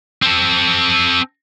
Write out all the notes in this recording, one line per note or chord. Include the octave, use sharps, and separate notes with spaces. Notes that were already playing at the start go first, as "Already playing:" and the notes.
C4 A4